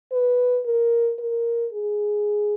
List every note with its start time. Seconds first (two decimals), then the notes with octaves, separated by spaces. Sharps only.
0.12 B4
0.66 A#4
1.19 A#4
1.73 G#4